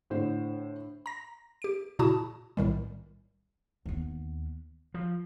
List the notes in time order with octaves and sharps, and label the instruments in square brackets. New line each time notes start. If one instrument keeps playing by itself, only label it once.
[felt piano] A2 D3 C5
[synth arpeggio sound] A#5 A#6
G4 D7
A#2 C#3 E4 F#4 A5 D#6
B1 A2 D#3 G3
[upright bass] D#2 B3
[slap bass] F3